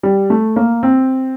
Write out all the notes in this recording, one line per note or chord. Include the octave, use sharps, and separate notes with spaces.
G3
A3
A#3
C4